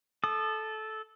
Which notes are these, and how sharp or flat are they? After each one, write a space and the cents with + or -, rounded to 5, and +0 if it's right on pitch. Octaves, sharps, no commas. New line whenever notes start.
A4 -15 D#6 -35